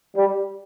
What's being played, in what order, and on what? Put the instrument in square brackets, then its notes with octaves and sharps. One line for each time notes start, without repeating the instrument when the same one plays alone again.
[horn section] G3